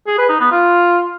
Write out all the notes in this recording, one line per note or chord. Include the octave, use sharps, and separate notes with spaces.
G#4
B4
D#4
B3
F4